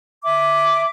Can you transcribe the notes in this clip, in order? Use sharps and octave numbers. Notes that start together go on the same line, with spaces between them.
E5 D6